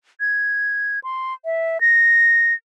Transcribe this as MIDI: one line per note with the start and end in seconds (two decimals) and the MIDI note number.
0.20 0.99 92
1.04 1.34 84
1.45 1.81 76
1.81 2.54 94